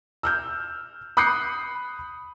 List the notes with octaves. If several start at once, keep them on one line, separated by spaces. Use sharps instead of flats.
E6 F6 G6
B5 D#6 F#6 G6 C7 C#7